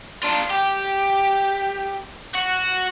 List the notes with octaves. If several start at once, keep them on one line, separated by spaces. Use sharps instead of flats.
D4 F4
G4
F#4